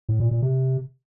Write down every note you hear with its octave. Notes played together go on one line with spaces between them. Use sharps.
A2
A#2
A#2
C3